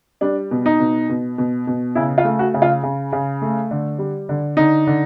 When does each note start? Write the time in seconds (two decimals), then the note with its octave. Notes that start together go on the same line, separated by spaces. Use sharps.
0.21 G3 D4
0.51 B2
0.66 D#4
0.80 B2
1.09 B2
1.38 B2
1.67 B2
1.95 C#3 E4
2.18 F4
2.24 A3
2.39 F#4
2.54 C#3
2.62 F4
2.83 C#3
3.12 C#3
3.42 A3
3.71 D3
3.99 G3
4.29 D3
4.57 D3 D#4
4.87 D3